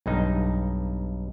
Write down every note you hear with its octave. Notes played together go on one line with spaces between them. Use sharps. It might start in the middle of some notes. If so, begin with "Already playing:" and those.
B1 G2 D#4